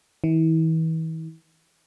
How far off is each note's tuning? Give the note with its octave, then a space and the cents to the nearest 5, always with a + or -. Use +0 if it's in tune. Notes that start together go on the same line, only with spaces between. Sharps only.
E3 -40